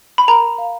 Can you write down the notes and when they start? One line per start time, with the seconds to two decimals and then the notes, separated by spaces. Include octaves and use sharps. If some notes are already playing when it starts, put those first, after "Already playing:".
0.18 B5
0.28 A#4 A#5
0.58 F5